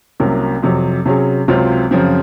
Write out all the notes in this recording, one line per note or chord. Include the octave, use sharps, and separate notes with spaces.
C2 C3 F#3 A#3 C#4
F2 C3 F#3
C3 F#3 C#4 G#4
C#2 C3 F#3 C4 F4
F#2 C#3 F3 C4